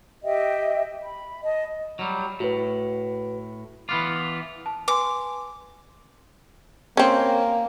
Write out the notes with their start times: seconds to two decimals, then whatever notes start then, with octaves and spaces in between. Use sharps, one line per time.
0.23 G4 D#5 E5 G5
1.03 B5
1.42 D#5 A5
1.99 F#3 G3
2.40 A2 F#4 B4
3.89 E3 B3 F4 D6
4.66 A5
4.88 B4 G#5 C6 D6
6.97 A#3 C4 C#4